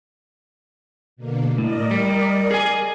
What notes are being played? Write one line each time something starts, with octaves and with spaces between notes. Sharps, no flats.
B2 D3 A#3
A2 A#4 D5 D#5
G3
G#4 G#5